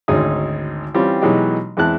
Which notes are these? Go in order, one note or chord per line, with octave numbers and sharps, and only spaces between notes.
G#1 D2 C#4 D#4 G#4 D#6
E3 G3 C4 C#4 F4
B2 E3 F#3 G#3 D#4 G4
E2 G#3 C4 E4 A5 F#6